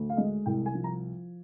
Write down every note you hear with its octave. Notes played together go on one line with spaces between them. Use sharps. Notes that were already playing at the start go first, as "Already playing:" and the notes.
Already playing: D2
F5
G#3 D#5
C2 G5
G#5
F3
A#5